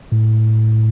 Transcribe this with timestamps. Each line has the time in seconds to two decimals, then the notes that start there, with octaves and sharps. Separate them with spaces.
0.12 A2